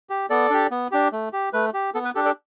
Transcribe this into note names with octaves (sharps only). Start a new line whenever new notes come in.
G4
B3 A4 D5
D4 G4
B3
D4 G4
A3
G4
A3 B4
G4
B3 A4
B4
D4 G4 A4
A4 D5